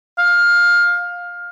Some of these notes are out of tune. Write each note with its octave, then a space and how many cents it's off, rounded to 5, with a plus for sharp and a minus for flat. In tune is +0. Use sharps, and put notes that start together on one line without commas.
F5 +15